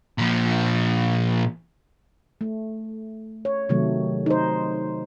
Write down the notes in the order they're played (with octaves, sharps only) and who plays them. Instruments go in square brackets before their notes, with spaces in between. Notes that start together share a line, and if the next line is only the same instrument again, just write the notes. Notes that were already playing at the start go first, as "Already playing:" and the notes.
[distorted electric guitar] A#2 F3
[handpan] A3
C#5
C3 D#3 F#3 A3
D#4 C5